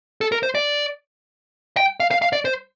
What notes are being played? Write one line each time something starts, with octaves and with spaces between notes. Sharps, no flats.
A4
A#4
C5
D5
G5
F5
F5
F5
D5
C5